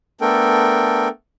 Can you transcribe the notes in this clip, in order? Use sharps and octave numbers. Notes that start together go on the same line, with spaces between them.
A3 B3 D4 A4 A#4 G5